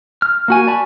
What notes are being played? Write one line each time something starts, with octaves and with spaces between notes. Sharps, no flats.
F6
A#3 F#4 G#5
D5 A5 B5 C#6